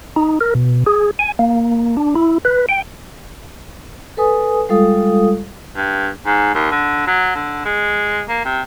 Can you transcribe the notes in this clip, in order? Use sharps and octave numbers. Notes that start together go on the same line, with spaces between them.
D#4
A#4
B2
G#4
G#5
A#3
D4
E4
B4
G5
A4 B4 G#5 D#6
G3 G#3 F4 A4 F5 D#6
G2
G#2
D#2
D3
F#3
D3
G#3
A#3
C3